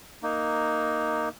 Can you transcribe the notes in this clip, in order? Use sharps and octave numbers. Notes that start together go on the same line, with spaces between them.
A#3 D#4